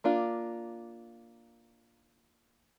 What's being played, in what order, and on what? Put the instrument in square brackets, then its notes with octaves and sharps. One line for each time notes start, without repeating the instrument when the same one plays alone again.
[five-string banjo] A#3 D4 F4